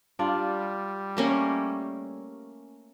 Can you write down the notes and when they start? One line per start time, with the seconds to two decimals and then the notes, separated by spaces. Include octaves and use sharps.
0.19 G3 D4 F4
1.17 A3 A#3 C#4